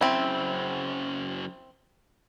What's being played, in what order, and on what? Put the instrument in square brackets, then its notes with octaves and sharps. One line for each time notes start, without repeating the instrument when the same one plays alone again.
[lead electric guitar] F#2 C#3 [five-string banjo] C4 E4